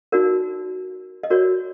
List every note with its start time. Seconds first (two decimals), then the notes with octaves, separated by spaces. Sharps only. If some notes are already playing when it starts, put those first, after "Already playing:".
0.12 D#4 F#4 A#4 D5
1.23 D#5
1.30 F#4 A#4 C#5 D5